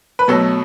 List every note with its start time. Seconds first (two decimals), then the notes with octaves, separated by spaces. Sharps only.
0.19 B4
0.28 B2 F#3 A3 A4